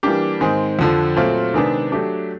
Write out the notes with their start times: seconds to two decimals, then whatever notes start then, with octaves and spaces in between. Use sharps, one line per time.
0.03 E3 G3 A#3 D4 G4
0.41 G#2 D#3 G#3 C4
0.79 F2 D3 F3
1.16 A#2 F#3 A3 C4 F4
1.54 C3 D#3 G#3 B3 D4
1.92 F#3 A3 D4 G4